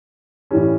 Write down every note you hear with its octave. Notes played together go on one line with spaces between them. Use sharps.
A2 E3 G3 C#4